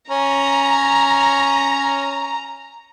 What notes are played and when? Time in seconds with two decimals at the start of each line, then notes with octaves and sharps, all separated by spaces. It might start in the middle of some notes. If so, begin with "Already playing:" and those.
0.10 C#4 A#5